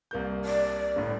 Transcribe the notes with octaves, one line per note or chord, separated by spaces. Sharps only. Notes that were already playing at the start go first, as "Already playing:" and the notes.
C2 A#3 G6
D5
G1 A2